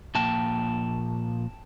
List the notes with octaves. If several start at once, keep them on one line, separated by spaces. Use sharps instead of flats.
A#2 F3 A#3 G5 A5